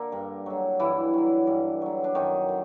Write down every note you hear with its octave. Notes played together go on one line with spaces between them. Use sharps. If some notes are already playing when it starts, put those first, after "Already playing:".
Already playing: D3 A#3 A#4
G2
D3 F#3
G2 E3 E4
D3 F#3
G2
D3 F#3
D4
F#2 D#3 D#4
D3